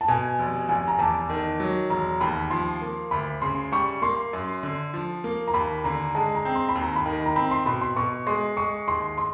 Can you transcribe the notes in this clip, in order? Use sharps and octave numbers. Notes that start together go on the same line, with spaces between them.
A5
B2 G#5
F1
F1 G#5
A#5
E2 A5
D#3
F#3
E1 A#5
D#2 B5
F3 C6
A#3
D2 B5
C#3 C6
G3 C#6
A#3 C6
F#2
D3
F3
A#3
A#5
D#2 B5
D3 A#5
G#3 A5
A#5
C4
C6
B5
D#2
A#5
B5
D#3
A#5
C4 B5
C6
B2 B5
C6
B2 C#6
G#3 C6
G#3 C#6
D#2 C6
C6